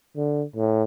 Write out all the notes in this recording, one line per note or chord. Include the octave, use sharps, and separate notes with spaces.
D3
A2